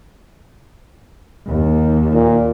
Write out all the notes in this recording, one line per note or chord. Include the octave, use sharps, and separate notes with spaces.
D#2
A#2